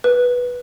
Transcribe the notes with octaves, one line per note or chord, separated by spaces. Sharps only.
B4